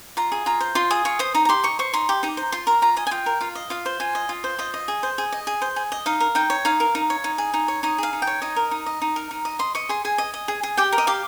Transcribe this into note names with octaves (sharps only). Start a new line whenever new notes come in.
F4 A#5
G#4
F4 A#5
C5
F4 C6
G#4 D#6
F4 C#6
C5 D#6
D#4 A#5
A#5
G4 C6
D#4 C#6
C5 C#6
D#4 C6
G4
D#4 A#5
C5
F4 C6
A#4 A#5
F4 A#5
D#5 G#5
G#5
F4 G5
A#4
F4 F5
D#5
F4 F5
C5
F4 G#5
D#5
F4
C5
F4 D#5
D#5
G#4
C5
G#4
D#5
G#4
C5
G#4
D#5
D#4 F5
A#4
D#4 G5
C#5
D#4 F5
A#4
D#4
C#5
D#4
G#4
D#4
C#5
D#4 D#5
G#4 F5
D#4
G5
C#5
D#4 D#5
A#4
D#4
D#5
D#4
A#4
D#4
D#5
D#5 C6
D#5 C#6
G#4 C6
G#4 G#5
D#5
D#5
G#4
G#4
G4 G5
A#4
D#5
G4 F5